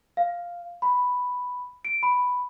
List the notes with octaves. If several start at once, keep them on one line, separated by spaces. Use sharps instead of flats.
F5
B5
D7
B5